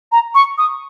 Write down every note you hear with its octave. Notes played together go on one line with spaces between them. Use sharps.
A#5
C#6
D#6